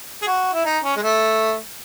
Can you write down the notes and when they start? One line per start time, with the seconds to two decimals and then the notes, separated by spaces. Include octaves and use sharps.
0.22 G#4
0.26 F#4
0.53 E4
0.65 D#4
0.84 C#4
0.96 G#3
1.02 A3